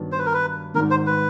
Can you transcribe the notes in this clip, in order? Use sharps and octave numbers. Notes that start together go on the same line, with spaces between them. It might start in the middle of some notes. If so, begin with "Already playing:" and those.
Already playing: G2 D#3 F#3 B3 D4
C5
B4
A#4
B4
G#1 G#2 D#3 A#4
C5
B4